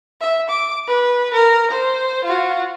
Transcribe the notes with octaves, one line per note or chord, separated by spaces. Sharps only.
E5
D6
B4
A#4
C5
F4 F#4